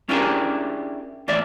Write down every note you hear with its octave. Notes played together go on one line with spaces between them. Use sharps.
C#4 D4 E4 G4 G#4 A#4
E2 A2 D5 E5